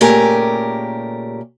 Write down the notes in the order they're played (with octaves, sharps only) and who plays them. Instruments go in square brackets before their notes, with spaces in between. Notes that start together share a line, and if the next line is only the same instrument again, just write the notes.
[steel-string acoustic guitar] A#2 C#3 A3 G4 A#4 G#5